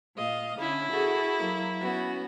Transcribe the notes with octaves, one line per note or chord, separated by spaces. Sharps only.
A#2 D#5 F5
D3 C#4 E4
F#4 G#4 A4
F#3 A#3
B3 C#4 F#4